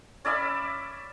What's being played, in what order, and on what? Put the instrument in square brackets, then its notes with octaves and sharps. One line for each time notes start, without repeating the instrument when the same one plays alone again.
[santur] C#4 D5 E5 B5